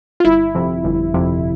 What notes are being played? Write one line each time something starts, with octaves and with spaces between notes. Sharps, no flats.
F4
G1 E4
F2 C3
G1
F2 C3